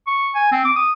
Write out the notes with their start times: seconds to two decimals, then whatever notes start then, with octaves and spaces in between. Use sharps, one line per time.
0.07 C#6
0.35 G#5
0.52 C4
0.65 D6
0.76 D#6